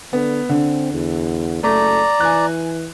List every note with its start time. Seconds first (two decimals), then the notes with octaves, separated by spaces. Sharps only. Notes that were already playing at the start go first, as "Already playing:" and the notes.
0.13 D3 B3
0.49 D3 C4
0.93 E2
1.63 F#1 A3 D5 A#5
2.20 E3 G#5 F#6